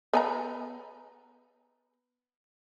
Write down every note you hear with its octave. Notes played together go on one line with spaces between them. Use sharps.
B3 G#5 A#5